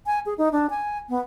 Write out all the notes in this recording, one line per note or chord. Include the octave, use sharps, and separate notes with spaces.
G#5
G#4
D#4
D4
G#5
B3